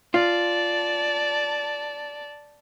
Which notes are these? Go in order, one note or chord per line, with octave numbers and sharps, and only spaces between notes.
F4 D5 A5